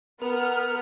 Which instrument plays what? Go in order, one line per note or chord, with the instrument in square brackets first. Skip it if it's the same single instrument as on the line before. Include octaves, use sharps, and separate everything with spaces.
[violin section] B3 [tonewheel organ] A#4 F6